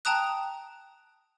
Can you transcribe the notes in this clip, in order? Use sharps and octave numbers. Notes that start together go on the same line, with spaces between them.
G5 A5 A#5 D#6 F#6